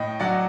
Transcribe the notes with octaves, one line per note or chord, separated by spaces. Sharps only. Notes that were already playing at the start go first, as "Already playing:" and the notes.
Already playing: A2 D#5 G5
F#3 D5 F#5